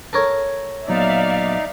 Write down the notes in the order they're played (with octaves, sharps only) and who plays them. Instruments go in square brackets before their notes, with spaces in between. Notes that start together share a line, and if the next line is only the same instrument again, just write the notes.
[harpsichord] A4 A#4 C#5
[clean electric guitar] A#2 F#3 B3 [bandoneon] D#4 [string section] D5 E5 F5